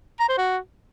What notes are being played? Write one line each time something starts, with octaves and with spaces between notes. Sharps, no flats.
A#5
C5
F#4